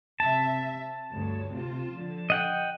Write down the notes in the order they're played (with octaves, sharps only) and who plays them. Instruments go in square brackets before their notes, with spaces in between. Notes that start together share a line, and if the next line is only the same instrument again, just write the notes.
[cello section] C3 E5 [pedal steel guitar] A5
[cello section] D2 G2 C#5
C3 F4
D3 F3
[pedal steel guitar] D#5 F#5 G5